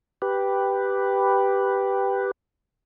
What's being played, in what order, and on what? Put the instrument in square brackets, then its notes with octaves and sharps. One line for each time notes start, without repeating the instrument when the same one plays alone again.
[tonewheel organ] G4 B4